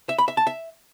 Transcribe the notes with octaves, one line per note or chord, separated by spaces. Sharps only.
E5
B5
E5
A5
E5